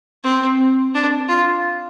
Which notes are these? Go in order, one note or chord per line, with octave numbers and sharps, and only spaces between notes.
C4
D4
F4